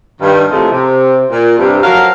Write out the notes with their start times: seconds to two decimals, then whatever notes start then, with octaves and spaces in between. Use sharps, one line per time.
0.21 G2 D#3
0.50 A2 C3 F3 G#3 A3 D#5
0.70 C3
1.30 A#2
1.58 G2 C3
1.83 F3 F#3 A4 A#4 F5